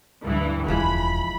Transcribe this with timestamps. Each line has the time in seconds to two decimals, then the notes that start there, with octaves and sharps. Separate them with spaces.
0.25 D2 G2 E3
0.68 E1 E3 F3 G#3 B5